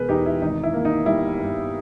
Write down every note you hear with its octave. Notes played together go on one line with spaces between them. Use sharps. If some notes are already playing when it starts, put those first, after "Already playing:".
Already playing: E1 B2 G#3 G#4 A#4 B4
E2 D#4 G4
E4
G#1 D#4
E4
A#3
D#4
G3 E4
G2